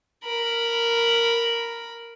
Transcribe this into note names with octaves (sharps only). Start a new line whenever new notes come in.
A#4 B5